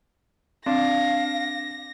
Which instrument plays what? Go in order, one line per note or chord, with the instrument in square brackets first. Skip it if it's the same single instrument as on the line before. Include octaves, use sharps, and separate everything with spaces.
[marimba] C4 [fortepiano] D4 [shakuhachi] F5 [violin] A#6